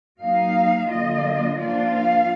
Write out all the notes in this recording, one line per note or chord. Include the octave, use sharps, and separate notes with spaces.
F#3 A#3 D#4 F5
D3 F#3 A#3 F4 D#5
F3 A#3 D4 F4 D5
F5